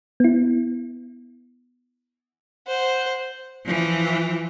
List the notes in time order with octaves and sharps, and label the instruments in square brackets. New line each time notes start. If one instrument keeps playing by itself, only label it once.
[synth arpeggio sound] B3 E4
[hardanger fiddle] C5 F#5
[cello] E3 F3